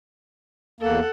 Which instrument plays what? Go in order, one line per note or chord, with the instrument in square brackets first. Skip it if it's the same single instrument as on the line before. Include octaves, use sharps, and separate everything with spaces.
[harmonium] E2 A#3 [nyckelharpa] A4 F#5